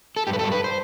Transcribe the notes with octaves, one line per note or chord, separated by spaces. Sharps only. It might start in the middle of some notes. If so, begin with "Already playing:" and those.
A4
G2 G4
B4
G2 A4
B4
C5